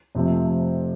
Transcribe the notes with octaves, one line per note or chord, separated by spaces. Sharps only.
F2 C3 F3 A3 C4